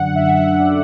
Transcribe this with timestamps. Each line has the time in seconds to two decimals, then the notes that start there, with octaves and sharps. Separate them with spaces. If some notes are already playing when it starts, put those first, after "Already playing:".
Already playing: F#2 D3 F#5
0.15 E5
0.59 D5